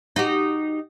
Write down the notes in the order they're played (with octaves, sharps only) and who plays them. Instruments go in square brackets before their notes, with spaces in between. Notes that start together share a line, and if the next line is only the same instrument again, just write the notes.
[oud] D#4 F#4 G4